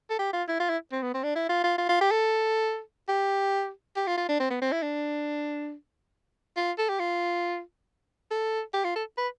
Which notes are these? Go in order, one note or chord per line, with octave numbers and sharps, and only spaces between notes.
A4
G4
F4
E4
F4
E4
C4
B3
C4
D4
E4
F4
F4
F4
F4
G4
A4
G4
G4
F4
F4
D4
C4
B3
C4
E4
D4
F4
A4
G4
F4
A4
G4
F4
A4
B4